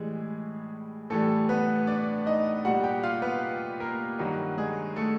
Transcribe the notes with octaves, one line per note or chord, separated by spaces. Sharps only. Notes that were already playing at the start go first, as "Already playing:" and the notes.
Already playing: A2 E3 G3 G#3 G#4
A2 E3 G3 A3 A4
B3 B4
D4 D5
D#4 D#5
A#2 G3 F#4 F#5
G4 G5
F4 F5
B3 B4
A#3 A#4
G2 D#3 F#3 F#4
G#3 G#4
A3 A4